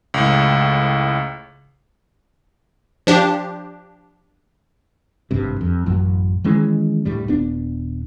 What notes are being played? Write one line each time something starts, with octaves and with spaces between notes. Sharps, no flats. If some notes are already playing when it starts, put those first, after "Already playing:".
C#2 A2
F3 D4 G4
G#1 G2 C3
F2
A1 F#2 F#3
D#3 E3 G#3 C#4
D2 A2 G3
D#1 B3 D4